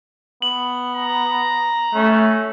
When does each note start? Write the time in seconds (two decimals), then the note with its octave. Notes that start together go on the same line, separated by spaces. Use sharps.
0.42 B3 F#7
0.95 A#5
1.95 A3 C#4